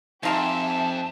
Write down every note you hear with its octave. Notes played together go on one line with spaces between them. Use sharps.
F2 D#4 F4 G4 G#4 E5 A5